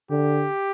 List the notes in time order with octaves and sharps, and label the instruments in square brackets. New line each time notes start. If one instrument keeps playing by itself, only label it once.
[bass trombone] D3 [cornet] G4